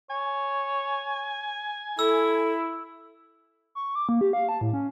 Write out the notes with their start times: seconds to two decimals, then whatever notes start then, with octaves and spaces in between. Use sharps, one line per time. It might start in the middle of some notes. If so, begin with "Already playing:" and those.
0.10 C#5 G#5
1.99 E4 A4 E6
3.75 C#6
3.95 D6
4.09 A#3
4.21 G4
4.33 F5
4.49 A5
4.61 A2
4.73 C#4